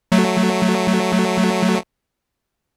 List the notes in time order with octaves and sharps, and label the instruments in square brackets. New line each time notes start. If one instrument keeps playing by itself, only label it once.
[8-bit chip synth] F#3 A3